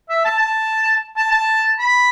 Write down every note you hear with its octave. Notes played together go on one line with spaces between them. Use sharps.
E5
A5
A5
A5
A5
B5